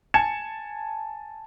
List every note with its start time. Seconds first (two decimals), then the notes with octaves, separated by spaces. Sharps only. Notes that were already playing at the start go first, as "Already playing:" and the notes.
0.14 G#5 A5 G#6 C#7 E7